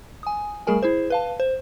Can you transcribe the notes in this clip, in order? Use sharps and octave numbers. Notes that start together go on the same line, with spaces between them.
G#5 D#6
G3 A3 G#4 A#4 G#5
E4 G#4 C5
B4 F5 A5
C5